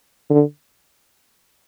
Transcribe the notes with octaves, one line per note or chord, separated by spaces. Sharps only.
D3